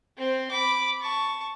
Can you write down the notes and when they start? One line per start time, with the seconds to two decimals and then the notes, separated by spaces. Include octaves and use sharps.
0.18 C4 C5
0.51 B5 D6
1.01 A5 C#6